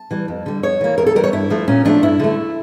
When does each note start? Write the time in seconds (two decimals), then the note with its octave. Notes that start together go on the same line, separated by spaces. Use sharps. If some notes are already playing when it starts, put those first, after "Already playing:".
Already playing: A5
0.11 E3 G3
0.28 F2
0.46 D3 G3
0.63 F2 C#5
0.81 E3 A#3
0.98 E2 A#4
1.07 A4
1.16 E3 G3 A#4
1.24 C#5
1.33 G2 E4
1.50 F3 A3
1.68 A#2 C#4
1.85 F3 A3 D4
2.03 G2 E4
2.20 D3 A3